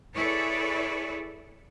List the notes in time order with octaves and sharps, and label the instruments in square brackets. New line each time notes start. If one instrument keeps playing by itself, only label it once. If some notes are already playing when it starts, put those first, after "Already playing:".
[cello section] E4 G#4 A4 B4 C#5 D5